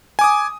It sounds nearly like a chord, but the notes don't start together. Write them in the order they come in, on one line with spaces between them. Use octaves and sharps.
G#5 D6 D#6